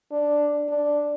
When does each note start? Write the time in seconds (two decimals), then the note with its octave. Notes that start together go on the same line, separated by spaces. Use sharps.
0.12 D4
0.69 D4